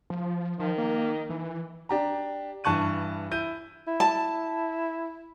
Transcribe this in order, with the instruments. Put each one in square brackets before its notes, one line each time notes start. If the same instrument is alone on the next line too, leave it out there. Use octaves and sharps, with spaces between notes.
[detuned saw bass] F3
[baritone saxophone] D#3 [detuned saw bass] F3
[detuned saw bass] A#3
E3
[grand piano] D4 G4 A#5
G2 E3 A5 C#6 F#6 D#7
E4 G6 D#7
[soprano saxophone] E4
[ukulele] A5